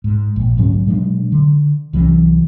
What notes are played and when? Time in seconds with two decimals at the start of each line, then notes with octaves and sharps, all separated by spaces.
0.04 G#2
0.36 A#1
0.57 D2 G#2 F#3 C#4
0.87 B2 F#3 G#3 D4
1.32 D3
1.93 C2 E3 F#3 C#4